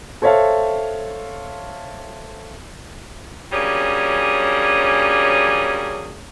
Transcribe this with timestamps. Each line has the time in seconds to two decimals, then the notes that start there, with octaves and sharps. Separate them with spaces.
0.22 A4 C5 C#5 E5 F5 A5
3.52 F#3 G3 A#3 C#4 D4 G#4